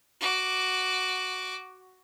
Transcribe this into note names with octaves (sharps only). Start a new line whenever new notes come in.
F#4 D6